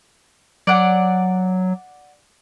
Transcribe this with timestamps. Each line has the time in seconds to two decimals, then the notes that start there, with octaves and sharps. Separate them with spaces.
0.67 F#3 D5 F#5